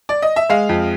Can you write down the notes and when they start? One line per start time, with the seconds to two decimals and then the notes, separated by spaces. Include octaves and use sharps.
0.09 D5
0.22 D#5
0.36 E5
0.50 G#3 F5
0.69 F2